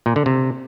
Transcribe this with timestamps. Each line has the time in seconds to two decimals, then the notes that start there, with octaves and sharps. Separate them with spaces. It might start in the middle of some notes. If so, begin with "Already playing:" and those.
0.06 A#2
0.16 D3
0.26 C3